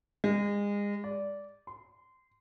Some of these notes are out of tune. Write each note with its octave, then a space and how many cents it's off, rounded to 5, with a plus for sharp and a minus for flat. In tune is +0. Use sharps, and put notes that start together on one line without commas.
G#3 -30
D5 -15
C6 -20